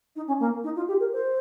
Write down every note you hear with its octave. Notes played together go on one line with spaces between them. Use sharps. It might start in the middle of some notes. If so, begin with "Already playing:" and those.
D#4
C#4
A#3
D#4
F4
G4
A#4
C5